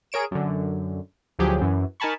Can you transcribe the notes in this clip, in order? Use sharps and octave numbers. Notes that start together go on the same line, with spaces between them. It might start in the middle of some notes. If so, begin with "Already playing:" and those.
G#4 A#4 C#5 D7 E7
F#2 D3
D2 F3 F#3 G4 G#4
F#2 E3
D#4 A#4 G#5 A5 B5 C#6